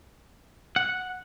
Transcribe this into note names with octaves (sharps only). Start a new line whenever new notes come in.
F#5